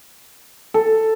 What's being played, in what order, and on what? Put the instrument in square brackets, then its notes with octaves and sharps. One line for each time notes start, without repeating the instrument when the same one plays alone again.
[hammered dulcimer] A4